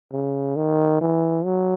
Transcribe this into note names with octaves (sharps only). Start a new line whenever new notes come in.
C#3
D#3
E3
F#3